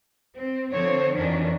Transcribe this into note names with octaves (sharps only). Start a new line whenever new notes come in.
C4
D3 F3 C4 C5 C#5
F2 D#3 E3 F#3 C#4 D4